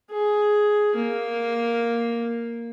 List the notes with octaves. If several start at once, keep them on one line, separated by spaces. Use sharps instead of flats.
G#4
A#3